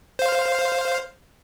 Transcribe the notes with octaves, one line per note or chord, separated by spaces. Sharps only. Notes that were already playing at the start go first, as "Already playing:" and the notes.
C5 F5